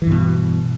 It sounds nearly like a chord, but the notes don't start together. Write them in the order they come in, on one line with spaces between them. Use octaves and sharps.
E3 G2 B2